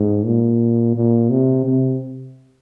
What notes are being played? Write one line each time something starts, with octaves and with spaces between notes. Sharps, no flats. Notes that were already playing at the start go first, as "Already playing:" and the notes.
Already playing: G#2
A#2
A#2
C3
C3